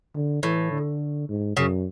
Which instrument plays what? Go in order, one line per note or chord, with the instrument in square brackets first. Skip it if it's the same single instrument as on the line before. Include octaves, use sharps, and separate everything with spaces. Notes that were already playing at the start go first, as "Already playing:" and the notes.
[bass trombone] D3
[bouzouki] A2 [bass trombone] E3
[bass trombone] D3
G#2
[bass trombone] F#2 [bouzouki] C#3